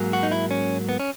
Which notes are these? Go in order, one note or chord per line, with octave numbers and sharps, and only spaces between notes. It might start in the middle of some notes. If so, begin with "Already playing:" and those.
Already playing: G#2 F#3 A#3
F#4
D#4
E4
C#4
B3
C#4